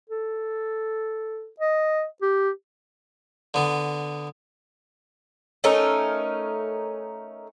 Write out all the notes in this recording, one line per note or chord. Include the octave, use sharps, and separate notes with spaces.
A4
D#5
G4
D3 B3
A3 C#4 D#4 A#4